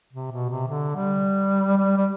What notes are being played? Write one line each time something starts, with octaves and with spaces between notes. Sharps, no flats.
C3
B2
C3
D3
G3
G3
G3